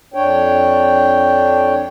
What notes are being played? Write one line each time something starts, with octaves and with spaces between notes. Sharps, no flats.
F2 D4 C#5 G5